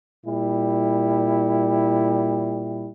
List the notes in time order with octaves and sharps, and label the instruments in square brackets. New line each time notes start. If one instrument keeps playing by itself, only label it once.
[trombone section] A#2 G3 E4